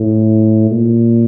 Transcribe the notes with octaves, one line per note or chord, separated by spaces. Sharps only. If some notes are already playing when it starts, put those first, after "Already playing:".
Already playing: A2
A#2